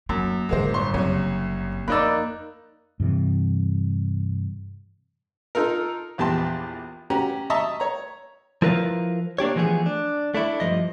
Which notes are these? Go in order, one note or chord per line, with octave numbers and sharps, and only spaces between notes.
F#2 A#3
A2 D3 G#3 A#3 C5
G1 C6 C#6
F#1 C2 F#3 C#5
F2 A#3 D#4 D5 B5 E6 F#6
G2 C3 E3
D#4 F4 A4 A#4
A#1 E2 G4 A5 C6
C#4 F#4 G4 A#5
D#5 E5 A5 A#5 C#6 D#6
C#5 A#5
F3 E4 A#4 B4 D5 F5
A#3 D4 G4 C#5
E3 F3 A3 B3 G#4
D4
A3 D4 E4
G2 F3 D#5